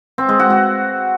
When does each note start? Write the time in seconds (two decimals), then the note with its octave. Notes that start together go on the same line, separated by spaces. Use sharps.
0.18 C4
0.29 G#3
0.39 F#4
0.50 F#4